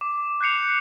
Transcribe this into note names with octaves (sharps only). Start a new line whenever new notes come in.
D6
F#6 G6 C7 C#7 F7